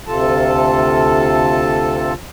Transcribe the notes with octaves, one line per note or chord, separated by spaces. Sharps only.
D2 C3 F4 A4 A5